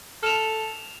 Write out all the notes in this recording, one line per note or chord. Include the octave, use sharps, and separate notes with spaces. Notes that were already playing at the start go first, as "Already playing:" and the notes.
A4 F6 E7 F7